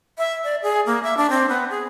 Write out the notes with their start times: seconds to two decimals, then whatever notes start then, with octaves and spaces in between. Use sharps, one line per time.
0.18 E5
0.44 D5
0.63 G#4
0.86 A#3
1.03 E5
1.17 D4
1.30 C4
1.49 B3
1.70 G#4